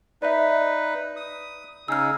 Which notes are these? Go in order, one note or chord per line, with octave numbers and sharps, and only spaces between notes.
D#4 B4 D5 E5
D#6
C#3 D#4 G#4 E6 F6